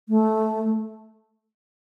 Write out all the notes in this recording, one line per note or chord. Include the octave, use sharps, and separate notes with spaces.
A3